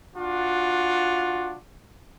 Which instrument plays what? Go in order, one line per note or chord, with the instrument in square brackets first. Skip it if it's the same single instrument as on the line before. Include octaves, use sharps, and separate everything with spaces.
[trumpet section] D4 F4 F#4